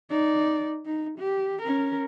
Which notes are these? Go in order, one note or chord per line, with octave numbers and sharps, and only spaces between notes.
D#4 D5
D#4
G4
C#4 A#4